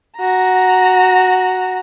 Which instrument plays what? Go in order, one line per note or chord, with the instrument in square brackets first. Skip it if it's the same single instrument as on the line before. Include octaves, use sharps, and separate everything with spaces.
[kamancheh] F#4 A#5